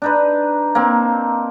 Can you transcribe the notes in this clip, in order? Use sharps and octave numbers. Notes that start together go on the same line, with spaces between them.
D4 D#4 B4
A#3 C4